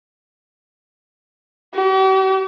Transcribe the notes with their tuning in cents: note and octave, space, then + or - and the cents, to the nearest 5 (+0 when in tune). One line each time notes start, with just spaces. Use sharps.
G4 -45